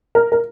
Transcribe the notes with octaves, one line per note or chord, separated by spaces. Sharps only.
A#4
A#4